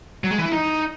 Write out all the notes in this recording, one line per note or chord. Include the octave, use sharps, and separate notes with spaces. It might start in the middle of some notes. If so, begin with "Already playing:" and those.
F#3
G#3
E3
E4
D#4